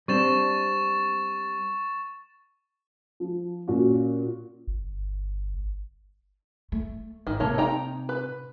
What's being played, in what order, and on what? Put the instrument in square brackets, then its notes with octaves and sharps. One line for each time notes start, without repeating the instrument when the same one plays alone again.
[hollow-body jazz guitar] G3 C4 D4 [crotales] C#6 A6 E7
[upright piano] F3
A#2 C#4 F#4
[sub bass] G1
[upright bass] A3
[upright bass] G#1 [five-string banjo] D#3
[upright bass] C3 [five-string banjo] A3 A#3 C#5
[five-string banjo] D#4 G5 A#5
B4